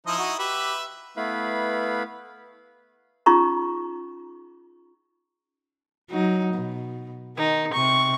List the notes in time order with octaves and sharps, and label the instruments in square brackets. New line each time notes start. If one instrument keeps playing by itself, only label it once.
[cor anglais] F3 [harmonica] D#4 E4 D#5
[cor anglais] F#4
[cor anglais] G4 [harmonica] B4 E5
[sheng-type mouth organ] A3 B3 E4 B4 F5 B5
[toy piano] C#4 D#4 F4 G#4 A#5 C#6
[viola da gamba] F#3 D#4
B2
[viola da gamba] D#3 [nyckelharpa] D#4
[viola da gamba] C3 [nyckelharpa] C#6